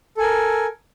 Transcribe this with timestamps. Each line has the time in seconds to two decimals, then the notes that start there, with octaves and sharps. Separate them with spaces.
0.17 A4
0.20 G#5
0.22 A#4